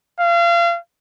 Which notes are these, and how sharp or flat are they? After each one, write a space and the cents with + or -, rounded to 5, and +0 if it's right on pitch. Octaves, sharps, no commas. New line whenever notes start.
F5 -30